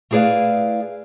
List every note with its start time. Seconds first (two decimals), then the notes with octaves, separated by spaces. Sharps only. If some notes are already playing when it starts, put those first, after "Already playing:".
0.11 A3 E4 G#4 B4 D5 F5